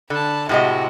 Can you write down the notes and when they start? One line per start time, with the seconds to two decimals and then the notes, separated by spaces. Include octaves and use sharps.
0.10 D3 A5 B5
0.49 A2 C3 G#3 F#4 D#5